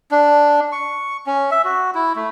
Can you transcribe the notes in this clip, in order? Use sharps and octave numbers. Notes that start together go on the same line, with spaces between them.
D4
C#6
C#4
E5
F#4
E4
A3